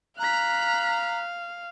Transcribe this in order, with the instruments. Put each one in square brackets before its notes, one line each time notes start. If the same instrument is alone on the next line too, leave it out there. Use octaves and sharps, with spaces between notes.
[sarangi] F5 [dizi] A#5 [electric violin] F#6 B6